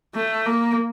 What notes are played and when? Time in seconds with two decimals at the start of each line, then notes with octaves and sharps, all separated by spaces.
0.15 A3
0.46 A#3